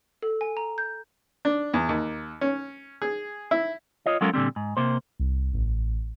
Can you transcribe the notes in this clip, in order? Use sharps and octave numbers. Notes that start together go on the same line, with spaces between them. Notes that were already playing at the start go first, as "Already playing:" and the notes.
A4
G#5
A#5
G6
D4
E2
D#2
C#4
G#4
E4
F4 C#5 D#5
F#3 G#3 C#4 F4 A4 A#4
A#2 D3 G3 C4
G#2
C3 A#3 C5
C2
A1